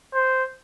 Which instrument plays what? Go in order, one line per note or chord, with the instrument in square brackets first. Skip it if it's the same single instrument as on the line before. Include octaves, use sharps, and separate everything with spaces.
[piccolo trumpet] C5